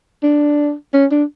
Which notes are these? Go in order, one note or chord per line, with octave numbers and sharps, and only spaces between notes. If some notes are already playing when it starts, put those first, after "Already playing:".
D4
C#4
D4